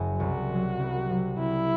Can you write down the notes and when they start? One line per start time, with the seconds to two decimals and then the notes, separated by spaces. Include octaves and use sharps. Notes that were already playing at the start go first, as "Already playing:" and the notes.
Already playing: F#1 F#2 F#3
0.20 C2 F#4
0.49 C3 F#3
0.79 C2
1.10 C3 F#3
1.38 C2 E4